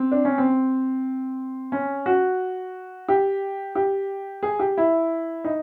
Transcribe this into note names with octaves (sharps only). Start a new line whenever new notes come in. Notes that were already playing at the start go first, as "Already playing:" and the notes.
Already playing: C4
D4
C#4
C4
C#4
F#4
G4
G4
G#4
G4
E4
D#4